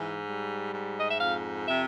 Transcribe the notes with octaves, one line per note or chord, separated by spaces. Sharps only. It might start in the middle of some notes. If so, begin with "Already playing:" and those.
Already playing: G#2 E3
G3
G#2
D#5
E5
F2 F5
C3 E5